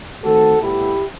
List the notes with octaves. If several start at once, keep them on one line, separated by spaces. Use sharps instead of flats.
D#3 A3 C4 F#4 A4
A2 G3 B3 E4 G4